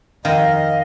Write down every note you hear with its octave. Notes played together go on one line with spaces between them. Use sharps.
F2 D#3 D#5 F5